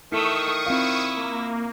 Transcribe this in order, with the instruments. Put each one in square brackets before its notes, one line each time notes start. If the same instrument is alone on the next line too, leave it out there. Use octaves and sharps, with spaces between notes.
[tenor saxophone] D#3 [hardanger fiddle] A3 E5 [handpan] E4 [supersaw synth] C#6 D#6
[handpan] C4 F4 F5 [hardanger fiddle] E4
[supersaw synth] A#3